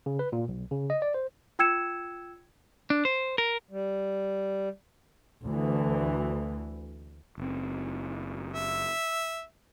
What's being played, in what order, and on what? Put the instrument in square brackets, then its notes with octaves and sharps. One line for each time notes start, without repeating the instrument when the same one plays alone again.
[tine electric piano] C#3
B4
A#2
B1
C#3
D#5
D5
C5
[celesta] F4 G5 E6 G#6 C#7 E7
[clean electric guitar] D4
C5
A#4
[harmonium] G3
[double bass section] D2 E3
[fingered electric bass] F#1 C4
[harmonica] E5